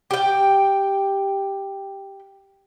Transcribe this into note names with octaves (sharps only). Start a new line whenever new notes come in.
G4 G5